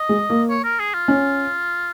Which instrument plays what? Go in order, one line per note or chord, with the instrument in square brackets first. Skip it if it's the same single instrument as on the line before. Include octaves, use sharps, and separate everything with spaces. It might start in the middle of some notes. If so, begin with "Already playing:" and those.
Already playing: [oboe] D#5
[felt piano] G#3
A#3
[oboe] C#5
A#4
G#4
F4
[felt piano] C#4